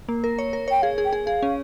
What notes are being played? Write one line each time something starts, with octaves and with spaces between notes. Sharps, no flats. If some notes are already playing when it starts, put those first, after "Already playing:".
A#3
A#4
C#5
A#4
C#5 G5
G#4 F5
G#4
G5
G#4
G#4 F5
C#4